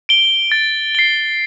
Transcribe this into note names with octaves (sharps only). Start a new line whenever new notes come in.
D7 G7
A6
C7 G7